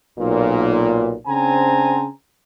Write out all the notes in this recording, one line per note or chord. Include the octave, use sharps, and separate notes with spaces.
B1 A#2
C#3 C4 D4 C5 G#5 A#5